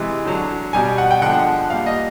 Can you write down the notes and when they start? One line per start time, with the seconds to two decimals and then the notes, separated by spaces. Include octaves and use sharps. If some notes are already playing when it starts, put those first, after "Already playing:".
Already playing: C3 E3 G#3
0.25 D3 F#3
0.73 B2 G3 G#5
0.98 F#5
1.11 G5
1.22 D3 F3 G#3 F#5
1.70 A#2 G3 F5
1.86 D#5